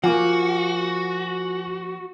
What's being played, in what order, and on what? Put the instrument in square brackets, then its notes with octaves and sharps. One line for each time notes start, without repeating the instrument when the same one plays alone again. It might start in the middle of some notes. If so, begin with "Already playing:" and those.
[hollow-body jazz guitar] F3 A#3 [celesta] F4 [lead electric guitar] F#4 [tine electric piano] F#5 G#5 D6